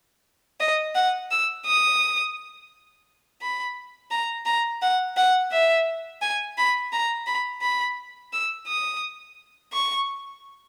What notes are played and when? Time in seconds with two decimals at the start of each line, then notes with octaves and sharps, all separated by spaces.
0.60 D#5
0.95 F#5
1.31 E6
1.66 D#6
3.41 B5
4.11 A#5
4.45 A#5
4.82 F#5
5.16 F#5
5.52 E5
6.21 G#5
6.57 B5
6.92 A#5
7.26 B5
7.62 B5
8.32 E6
8.67 D#6
9.73 C#6